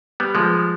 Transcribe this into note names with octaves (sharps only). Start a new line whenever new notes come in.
G3 B3
F3 G#3